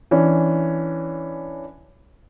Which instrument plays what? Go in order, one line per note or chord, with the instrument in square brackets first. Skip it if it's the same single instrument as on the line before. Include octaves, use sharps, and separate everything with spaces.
[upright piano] E3 C#4 D4